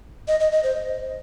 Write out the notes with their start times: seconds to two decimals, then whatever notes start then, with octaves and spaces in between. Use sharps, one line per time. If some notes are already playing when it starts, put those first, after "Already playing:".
0.28 D#5
0.40 D#5
0.52 D#5
0.63 C5